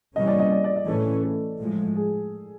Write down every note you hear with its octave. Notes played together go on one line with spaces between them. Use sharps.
C3 E3 G3 A#3 C#4 D#5
D5
D#5
D5
D5
D#5
A2 E3 A3 C#4 A4
A4
A2 F3 G#3
G#4